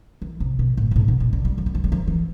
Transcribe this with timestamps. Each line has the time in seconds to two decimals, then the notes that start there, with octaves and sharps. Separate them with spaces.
0.22 E3
0.40 C3
0.59 B2
0.77 A2
0.91 B2
0.96 A2
1.08 B2
1.20 B2
1.33 D3
1.45 G3
1.58 F3
1.66 G3
1.75 F3
1.84 G3
1.92 F3
2.08 E3